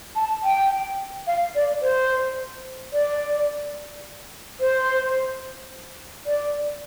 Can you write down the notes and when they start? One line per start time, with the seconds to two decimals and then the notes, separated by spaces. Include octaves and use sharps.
0.16 A5
0.44 G5
1.27 F5
1.55 D5
1.82 C5
2.93 D5
4.60 C5
6.26 D5